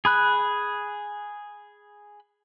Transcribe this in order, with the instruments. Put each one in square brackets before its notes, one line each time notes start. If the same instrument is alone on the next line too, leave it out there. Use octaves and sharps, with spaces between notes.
[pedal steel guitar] G#4 B5 F#6